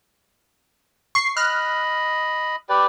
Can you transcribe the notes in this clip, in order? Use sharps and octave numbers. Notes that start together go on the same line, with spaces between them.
C#6 C7
D#5 B5 F6 F#6
G4 B4 D5